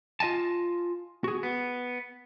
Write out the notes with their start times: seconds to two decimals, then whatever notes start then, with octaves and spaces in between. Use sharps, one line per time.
0.20 F4 D#5 G#5 A5
1.24 F#4 G#4
1.43 B3